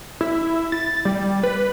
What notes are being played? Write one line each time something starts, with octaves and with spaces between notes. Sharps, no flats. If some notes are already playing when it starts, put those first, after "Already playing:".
E4
A6
G3
B4